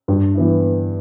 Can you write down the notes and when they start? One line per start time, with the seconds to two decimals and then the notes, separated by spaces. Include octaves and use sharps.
0.08 G2
0.35 E3 B3 E4